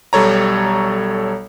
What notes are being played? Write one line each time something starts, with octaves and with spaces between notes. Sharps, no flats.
B1 G3 A4 C#5 A#5